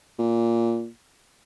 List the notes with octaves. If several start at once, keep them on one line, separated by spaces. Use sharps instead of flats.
A#2